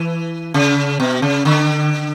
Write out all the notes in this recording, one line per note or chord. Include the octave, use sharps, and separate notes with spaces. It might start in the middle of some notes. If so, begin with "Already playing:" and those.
Already playing: E3
C#3
B2
C#3
D3